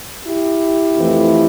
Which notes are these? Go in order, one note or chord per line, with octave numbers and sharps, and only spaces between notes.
E4 G4
F2 E3 A3